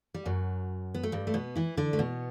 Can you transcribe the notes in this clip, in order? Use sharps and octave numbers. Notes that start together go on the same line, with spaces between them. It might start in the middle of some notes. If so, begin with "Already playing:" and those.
G3
F#2 F#3
B3
A3
G2 G3
A3
B2 B3
E3 E4
D3 D4
A3
B2 B3